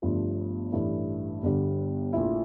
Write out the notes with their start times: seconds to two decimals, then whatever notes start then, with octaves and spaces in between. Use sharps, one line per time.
0.02 G1 G2 F3 A3
0.72 A1 G2 E3 A3 E4
1.43 G1 G2 D3 G3
2.13 A#1 A#2 F3 A3 E4